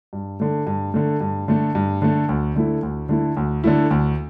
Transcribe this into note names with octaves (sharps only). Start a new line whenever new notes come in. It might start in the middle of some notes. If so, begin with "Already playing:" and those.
G2
D3 A3
G2
D3 A3
G2
D3 A3
G2
D3 A3
D2
D3 A3 E4
D2
D3 A3 E4
D2
D3 A3 E4
D2